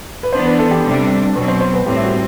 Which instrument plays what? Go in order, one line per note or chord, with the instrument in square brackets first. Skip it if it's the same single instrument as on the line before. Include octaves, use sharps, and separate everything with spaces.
[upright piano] B4
[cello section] E3 B3 D4 [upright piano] C5
[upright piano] B4
A4
G4
[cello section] C3 G3 D4
[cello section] B2 F#3 C4 [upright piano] B4
[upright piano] C5
C5
B4
[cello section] A2 G3 C4 [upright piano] G4
[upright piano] E4
F#4